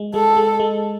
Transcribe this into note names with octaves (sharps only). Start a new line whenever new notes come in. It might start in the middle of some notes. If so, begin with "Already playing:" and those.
Already playing: G#3
G#3 A4
G#3
G#3